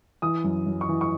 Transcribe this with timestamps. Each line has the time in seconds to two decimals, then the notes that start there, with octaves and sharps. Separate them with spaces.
0.22 E3 D#6
0.44 F#2
0.66 F#2
0.81 C#6
0.89 E3
1.01 C#6